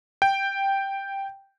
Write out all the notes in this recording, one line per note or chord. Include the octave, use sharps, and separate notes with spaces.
G5